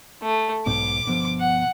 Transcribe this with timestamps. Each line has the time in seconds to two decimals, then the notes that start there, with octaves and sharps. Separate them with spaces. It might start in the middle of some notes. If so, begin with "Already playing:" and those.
0.22 A3
0.66 B1 G#2 B2 D6
1.05 G1 B2 F3
1.40 F#5